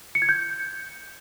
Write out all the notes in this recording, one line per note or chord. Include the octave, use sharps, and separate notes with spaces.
C#7
G#6
G6